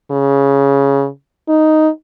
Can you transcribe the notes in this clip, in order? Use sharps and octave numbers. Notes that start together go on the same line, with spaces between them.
C#3
D#4